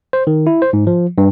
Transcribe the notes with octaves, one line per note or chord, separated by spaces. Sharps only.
C5
D#3
E4
C5
G#2
F3
G2